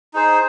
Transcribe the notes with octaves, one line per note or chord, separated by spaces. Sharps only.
D#4 G#4 C5